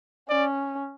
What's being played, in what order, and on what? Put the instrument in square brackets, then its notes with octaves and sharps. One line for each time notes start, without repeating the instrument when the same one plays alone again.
[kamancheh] C#4 [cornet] D5